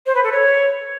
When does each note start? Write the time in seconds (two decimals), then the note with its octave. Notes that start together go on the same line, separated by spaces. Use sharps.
0.06 C5
0.15 B4
0.24 A4
0.32 C#5